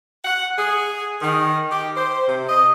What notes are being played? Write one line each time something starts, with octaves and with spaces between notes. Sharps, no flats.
F#5
G#4
D#3
G4
C5
C3
D#5